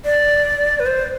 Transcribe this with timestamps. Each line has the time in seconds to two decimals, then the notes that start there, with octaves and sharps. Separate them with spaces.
0.05 D5
0.80 B4
0.86 C5